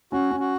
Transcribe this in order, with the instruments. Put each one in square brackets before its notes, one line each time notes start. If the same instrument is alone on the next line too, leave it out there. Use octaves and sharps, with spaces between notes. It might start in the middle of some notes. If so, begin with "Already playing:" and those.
[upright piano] C#4 [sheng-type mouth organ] F#4
[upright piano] C#4
[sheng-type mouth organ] F#4